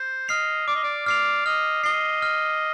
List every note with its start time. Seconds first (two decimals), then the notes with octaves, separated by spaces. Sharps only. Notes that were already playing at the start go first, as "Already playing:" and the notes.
Already playing: C5
0.28 D#5 F6 C7 F7
0.67 D5 D6
0.75 D#5
0.83 D5
1.06 D5 F6 C7 F7
1.45 D#5 F6
1.83 D#5 C7 G7
2.22 F6